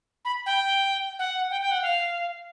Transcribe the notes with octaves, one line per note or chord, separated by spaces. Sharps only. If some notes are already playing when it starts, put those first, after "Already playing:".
B5
G5
F#5
G5
G5
F#5
F5